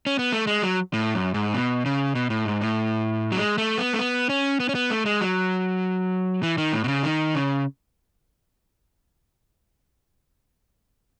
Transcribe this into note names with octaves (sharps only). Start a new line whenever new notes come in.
C#4
B3
A3
G#3
F#3
A2
F#2
G#2
B2
C#3
B2
A2
G#2
A2
F#3
G#3
A3
B3
A3
B3
C#4
B3
C#4
B3
A3
G#3
F#3
E3
D#3
A2
B2
C#3
D#3
C#3